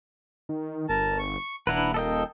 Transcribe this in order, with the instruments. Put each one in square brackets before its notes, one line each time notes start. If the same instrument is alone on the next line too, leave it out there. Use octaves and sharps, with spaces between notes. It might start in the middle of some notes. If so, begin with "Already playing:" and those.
[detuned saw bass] D#3
[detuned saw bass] G1 [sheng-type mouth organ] A#4 A5
[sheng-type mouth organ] C#6
[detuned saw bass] D#1 [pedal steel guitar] D4 E4 B4 [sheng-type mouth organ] F#5 A#5
[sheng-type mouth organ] A#3 [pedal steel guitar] A4 D#5 G5